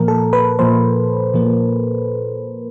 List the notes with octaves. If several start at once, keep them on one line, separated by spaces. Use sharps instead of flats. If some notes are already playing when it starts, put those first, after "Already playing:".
Already playing: A#2 F3 A#3 A#4
A4
B4
A#2 F3 A#3 C5
A#2 F3 A#3